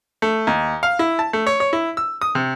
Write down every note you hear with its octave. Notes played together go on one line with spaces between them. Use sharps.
A3
D#2
F5
E4
A5
A3
C#5
C#5
E4
E6
D#6
C3